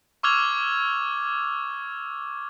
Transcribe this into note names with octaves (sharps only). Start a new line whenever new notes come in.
C#6 D6 E6 F6 G#6 F7